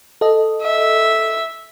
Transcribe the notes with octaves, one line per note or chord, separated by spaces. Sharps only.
A4 D#5
E5